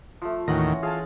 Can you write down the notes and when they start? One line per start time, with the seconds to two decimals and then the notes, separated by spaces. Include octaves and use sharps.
0.22 F3 A3
0.48 D#2 A2 D#3 E3 C#4 F#5 C6 A#6
0.83 F4 G#4 A5